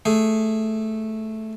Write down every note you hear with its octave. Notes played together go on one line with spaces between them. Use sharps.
A3 G#4